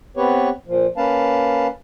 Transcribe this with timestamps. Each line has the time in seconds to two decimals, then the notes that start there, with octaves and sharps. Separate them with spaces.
0.17 B3 C4 G4 B4 C#5
0.67 A#2 F3
0.97 A#3 C#4 B4 F5 A5